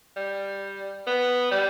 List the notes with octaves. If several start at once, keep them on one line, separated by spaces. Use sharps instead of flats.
G3
B3
G3